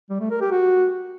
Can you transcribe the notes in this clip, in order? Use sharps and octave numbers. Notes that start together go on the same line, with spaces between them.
G3
A3
A#4
G4
F#4